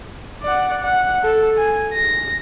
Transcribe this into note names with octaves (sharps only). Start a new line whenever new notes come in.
D5 F#5
F#5
A4
G#5
A#6